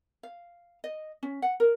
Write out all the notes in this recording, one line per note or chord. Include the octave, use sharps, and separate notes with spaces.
F5
D#5
C#4
F#5
A#4